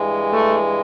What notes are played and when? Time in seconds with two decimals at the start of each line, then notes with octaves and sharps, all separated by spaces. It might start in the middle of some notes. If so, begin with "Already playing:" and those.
Already playing: G2 E3 G#3
0.32 A3